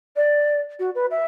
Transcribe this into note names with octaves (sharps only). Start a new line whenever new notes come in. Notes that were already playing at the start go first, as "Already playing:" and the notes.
D5
F#4
B4
E5